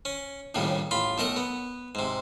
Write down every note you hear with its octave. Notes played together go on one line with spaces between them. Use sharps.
C#4
A#1 D#2 A2 C#3 G3
A1 F4 B5
B1 A3 A#4 D#5
B3
G#2 C3